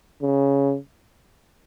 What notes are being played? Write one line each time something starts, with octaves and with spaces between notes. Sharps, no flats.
C#3